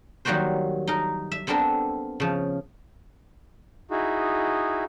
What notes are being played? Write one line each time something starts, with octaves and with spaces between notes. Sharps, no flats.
D#3 F#3 G3 A#3 F#4 C5
D#4 A#4
E5
B3 C4 D4 A4 A#4
C#3 F3
D#4 E4 F#4 G#4